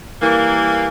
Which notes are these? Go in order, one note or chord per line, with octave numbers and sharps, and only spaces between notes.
E3 G3 A#3